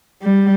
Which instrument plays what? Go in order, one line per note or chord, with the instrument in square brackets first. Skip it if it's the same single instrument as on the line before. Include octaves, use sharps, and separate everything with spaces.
[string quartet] G3